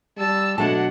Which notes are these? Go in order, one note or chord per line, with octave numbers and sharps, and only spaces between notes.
G3 A5 E6
B2 F#3 A3 D4 F#5 A5